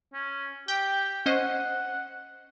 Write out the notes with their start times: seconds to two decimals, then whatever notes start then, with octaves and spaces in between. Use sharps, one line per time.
0.14 C#4
0.68 G4 G5
1.26 C#4 C5 D#5 F#5